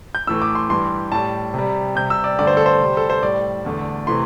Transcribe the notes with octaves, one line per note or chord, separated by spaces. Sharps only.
G6
A2 E3 A3 E6
D6
C6
G2 E3 G3 C6
A2 G3 A5
C3 G3
C3 G3 G6
E6
D5
G2 D3 A3 D5
C5
A4
C5
C3 G3
A4
C5
A2 G3 D5
E2 D3 A3
C3 E3 A3 C6